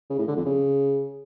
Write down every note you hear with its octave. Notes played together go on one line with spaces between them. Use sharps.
C#3
A2
D3
F2
C#3